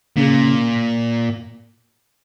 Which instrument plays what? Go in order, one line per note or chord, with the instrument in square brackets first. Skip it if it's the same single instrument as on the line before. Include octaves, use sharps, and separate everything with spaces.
[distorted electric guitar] A#2 [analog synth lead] C#3